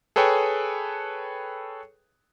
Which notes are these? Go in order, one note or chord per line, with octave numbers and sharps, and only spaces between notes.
G#4 A4 B4 C#5 G5